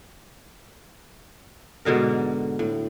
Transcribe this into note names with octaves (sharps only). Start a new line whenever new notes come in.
G#2 B2 D3 A#4
A2